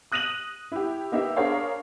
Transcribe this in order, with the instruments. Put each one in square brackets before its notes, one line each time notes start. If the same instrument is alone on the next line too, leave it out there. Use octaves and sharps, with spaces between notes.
[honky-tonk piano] D#6 F#6 A#6 D#7 F7 F#7
E4 G4
A#3 D#4 G4 B4 E5
D4 G#4 A#4 C5 C#5 F5